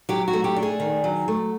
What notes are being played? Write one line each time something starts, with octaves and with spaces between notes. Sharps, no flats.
F#3 G4
F#4
A3
G4
D4
G#4
D#3
F#3
A3